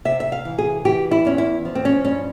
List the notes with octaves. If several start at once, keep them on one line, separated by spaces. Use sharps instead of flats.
C3 E5
E5
F5
E3
G#4
E3 G4
E4
E2 C#4
E4
F3
C4
C#4
G2 C#4